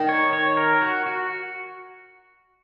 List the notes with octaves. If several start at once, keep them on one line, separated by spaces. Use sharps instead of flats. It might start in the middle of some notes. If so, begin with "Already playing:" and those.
Already playing: D#3
C#5
C#5
A#4
F#4
F#4